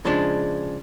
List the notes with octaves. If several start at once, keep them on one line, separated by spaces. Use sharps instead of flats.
C#3 F3 G#3 D4